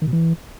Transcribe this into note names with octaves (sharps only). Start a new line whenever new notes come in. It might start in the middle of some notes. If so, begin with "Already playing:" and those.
D#3
B2
E3